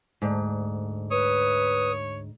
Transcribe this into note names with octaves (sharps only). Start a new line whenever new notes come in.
D2 G#2
B4 C#5 D#6